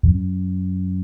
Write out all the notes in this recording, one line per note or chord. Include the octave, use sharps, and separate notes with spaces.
F2
F#2